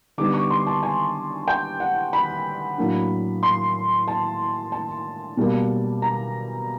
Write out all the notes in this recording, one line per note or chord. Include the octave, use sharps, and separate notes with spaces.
D3 G3 B3 D#4 D6
C#6
C6
A5
G#5
G5
F#5
B5
A2 F#3 A#3 D4
C6
A5
A5
B2 G3 A#3
A#5